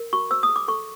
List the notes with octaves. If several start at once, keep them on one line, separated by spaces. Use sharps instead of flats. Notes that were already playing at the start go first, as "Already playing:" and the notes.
Already playing: A#4
F#4 C#6
C5 E6
D#6
G#4
D6
A4 C#6